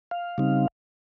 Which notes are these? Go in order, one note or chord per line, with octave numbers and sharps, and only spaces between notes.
F5
C#3 G3 C4 D#4